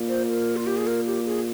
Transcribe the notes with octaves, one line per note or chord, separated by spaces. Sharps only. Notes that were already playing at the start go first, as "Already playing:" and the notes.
Already playing: A#2
C5
A#4
F4
G4
G#4
A#4
G4
G#4